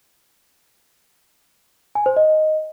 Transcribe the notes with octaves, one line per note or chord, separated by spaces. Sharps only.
G#5
C5
D#5